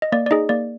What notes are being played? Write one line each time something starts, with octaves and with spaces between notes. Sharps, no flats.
D#5
A#3 D5
D5
D#4 G#4 D#5
A#3 D5